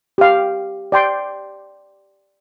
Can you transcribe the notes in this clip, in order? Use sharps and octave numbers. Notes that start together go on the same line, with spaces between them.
G4 F5
D5 G5 C6